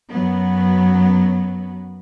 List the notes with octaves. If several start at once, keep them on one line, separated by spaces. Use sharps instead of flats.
F#2 F#3 B3